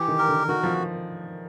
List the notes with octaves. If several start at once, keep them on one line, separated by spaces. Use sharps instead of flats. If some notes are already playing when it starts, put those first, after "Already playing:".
Already playing: E3 G4
D#3
A#4
D3
D#3 F#4
F3